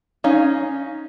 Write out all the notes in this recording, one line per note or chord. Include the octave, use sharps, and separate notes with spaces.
C#4 D#4 C#5 F5